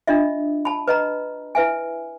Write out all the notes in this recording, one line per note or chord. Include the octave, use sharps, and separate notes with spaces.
D4 F4 D#5 E5
A5 B5
B4 D#5 A#5
E4 B4 E5 G#5